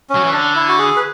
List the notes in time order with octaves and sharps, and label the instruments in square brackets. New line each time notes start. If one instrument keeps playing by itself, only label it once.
[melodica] C#4
[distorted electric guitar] F#3
E3
[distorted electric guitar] D3 [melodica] D4
[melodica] E4
F#4
G#4
B4